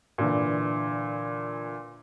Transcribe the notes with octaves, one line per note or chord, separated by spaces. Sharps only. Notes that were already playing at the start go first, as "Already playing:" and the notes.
A#2 D3 E3